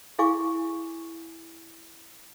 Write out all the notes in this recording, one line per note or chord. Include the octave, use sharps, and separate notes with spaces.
E4 G#4 F5 G#5 C#6 D6